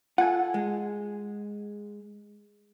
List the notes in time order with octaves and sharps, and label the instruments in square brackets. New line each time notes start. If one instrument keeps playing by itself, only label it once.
[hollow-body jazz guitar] F4 A4 [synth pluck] F#5 G#5
[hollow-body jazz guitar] G#3